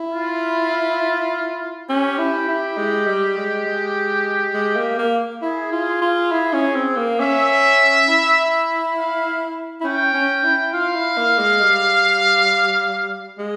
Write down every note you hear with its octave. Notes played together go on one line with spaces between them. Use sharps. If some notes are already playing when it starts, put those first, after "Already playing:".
Already playing: E4
F4
C#4 G4
E4
E4
G#3
G3
G#3
G#3
G#3
A#3
A#3
E4 G#4
F4
F4
E4
C#4
C4
A#3
C#4 E5
E4
F5
E4
C#4 G5
C#4
E4
F4 F5
E4
A#3
G#3
G3
G#3